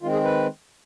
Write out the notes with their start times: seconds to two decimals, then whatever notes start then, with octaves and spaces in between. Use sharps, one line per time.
0.02 D#3 G#3 C4 F4
0.13 G#4
0.24 B4